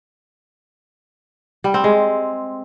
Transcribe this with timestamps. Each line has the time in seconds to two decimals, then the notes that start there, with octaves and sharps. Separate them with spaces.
1.64 G3
1.74 C4
1.84 G#3